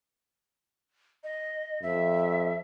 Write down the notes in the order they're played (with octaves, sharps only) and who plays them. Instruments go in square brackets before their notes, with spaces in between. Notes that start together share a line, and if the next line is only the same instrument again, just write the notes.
[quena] D#5
[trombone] F2 [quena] E5